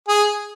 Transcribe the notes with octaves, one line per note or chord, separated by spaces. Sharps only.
G#4